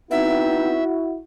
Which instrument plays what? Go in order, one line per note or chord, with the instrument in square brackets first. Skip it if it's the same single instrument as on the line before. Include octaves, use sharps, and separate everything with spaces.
[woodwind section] B3 C4 D#4 [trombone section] E4 F#4 [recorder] E5